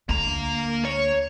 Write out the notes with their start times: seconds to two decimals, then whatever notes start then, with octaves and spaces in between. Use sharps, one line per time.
0.09 D2 A#3 A#5
0.85 C#5